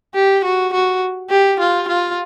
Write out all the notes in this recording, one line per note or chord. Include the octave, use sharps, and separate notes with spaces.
G4
F#4
F#4
G4
F4
F4